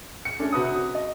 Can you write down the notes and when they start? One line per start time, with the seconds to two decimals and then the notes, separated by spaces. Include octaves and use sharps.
0.25 C#7
0.39 A3 C#4 D4
0.52 C3 F#4 B4 D#6
0.95 D#5